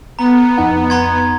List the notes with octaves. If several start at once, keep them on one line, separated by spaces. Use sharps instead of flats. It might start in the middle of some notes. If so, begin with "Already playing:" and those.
B3 A#5
F2 D#4 F#5
A#5 C6 G#6